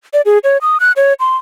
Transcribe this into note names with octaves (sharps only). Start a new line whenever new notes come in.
D5
G#4
C#5
D#6
F#6
C#5
C6